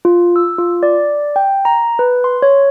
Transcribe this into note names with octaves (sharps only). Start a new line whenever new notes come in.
F4
E6
F4
D5
G5
A#5
B4
C6
C#5